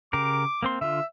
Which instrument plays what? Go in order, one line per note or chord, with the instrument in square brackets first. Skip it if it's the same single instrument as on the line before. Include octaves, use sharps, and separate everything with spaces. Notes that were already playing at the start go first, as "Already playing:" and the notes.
[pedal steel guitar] C#3 G4 A#4 [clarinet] D6
[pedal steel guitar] A#3 C4 C6
[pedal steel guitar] D3 F4 [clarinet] E5